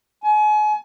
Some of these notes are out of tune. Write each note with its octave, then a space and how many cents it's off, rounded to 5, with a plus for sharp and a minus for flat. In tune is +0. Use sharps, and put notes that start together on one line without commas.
G#5 +35